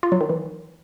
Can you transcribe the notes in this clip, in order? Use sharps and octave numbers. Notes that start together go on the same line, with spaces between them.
F4
F#3
D#3
E3